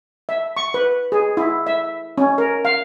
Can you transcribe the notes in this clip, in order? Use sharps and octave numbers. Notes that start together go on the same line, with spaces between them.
E5
C#6
B4
G#4
E4
E5
C#4
A#4
F5